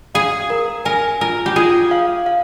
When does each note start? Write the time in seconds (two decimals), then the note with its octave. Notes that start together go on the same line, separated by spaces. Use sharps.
0.15 G#4 F5
0.50 A#4
0.85 A#4 G#5
1.21 F4 A#4
1.46 G4
1.56 F4 G#4
1.91 F5
2.26 F5